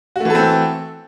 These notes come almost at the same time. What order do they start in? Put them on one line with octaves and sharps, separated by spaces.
F#4 A3 E3 A4 C4